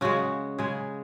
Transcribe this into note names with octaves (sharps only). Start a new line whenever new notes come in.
C#3 G#3 F#4
C#3 G#3 G#4